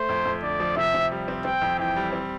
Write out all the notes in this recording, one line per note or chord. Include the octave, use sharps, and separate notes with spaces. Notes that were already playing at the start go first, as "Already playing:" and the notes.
Already playing: A3 C5
F2
F2
D3 D5
F3
C3 E5
C3
G3
C4
C4 G5
F2
E3 G5
G3
C4